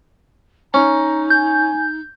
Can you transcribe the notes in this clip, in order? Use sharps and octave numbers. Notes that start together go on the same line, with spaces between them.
C#4 D#4 A#5
G#5 G6